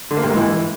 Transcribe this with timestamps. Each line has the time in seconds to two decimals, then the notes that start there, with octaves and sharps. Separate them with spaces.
0.11 D3
0.17 A#3
0.23 G2
0.30 G#2
0.36 E3